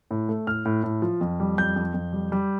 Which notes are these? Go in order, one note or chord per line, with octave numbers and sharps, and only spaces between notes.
A2
A3
A2 F6
A2
A2
F3
F2
G3
F2 G6
F2
F2
G3
G3